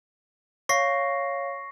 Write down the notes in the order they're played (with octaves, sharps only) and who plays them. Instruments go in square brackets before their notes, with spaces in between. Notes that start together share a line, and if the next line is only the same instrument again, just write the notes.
[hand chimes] C#5 F5 [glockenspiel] C#6 A#6 C7